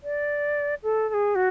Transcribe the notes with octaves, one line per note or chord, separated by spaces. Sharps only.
D5
A4
A4
G#4
F#4